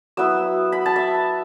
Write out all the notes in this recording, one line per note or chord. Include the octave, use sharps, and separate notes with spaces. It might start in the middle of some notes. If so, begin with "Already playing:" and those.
F#3 B3 E4 E6
B5
A5
E5